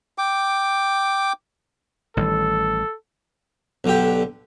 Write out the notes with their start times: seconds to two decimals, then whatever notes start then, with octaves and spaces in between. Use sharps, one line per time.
0.18 G5 D6
2.17 A1 D#3 G3 A4
3.84 B1 D3 G4